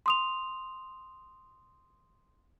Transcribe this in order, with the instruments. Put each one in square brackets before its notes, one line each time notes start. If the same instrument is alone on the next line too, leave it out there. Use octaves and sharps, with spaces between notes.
[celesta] C6 D#6 F7